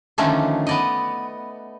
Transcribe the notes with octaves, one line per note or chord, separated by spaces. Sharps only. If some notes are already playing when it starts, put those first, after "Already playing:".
D3 D#3 F3 A3 C#4 D4
B3 D5 D#5